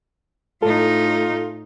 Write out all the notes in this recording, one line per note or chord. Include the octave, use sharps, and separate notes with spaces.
A2 D#4 F4 A4